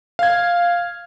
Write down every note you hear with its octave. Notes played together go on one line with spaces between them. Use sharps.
F5 G#6